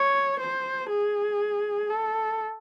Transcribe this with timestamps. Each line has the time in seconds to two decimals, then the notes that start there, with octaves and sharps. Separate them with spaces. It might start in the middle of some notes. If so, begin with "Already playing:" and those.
Already playing: C#5
0.40 C5
0.89 G#4
1.89 A4